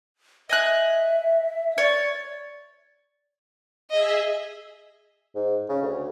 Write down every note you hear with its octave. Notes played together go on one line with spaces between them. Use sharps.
D#5 E5 G#5 F#6
C#5 D5
G#4 D#5 E5
G#2
C#3
D2